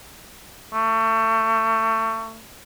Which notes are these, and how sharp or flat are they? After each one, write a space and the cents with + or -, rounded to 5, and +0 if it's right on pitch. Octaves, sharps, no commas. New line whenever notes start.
A3 +30